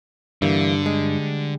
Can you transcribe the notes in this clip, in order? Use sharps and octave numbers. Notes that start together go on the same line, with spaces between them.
G2 D3 E3 G3 A#3
G3 G#3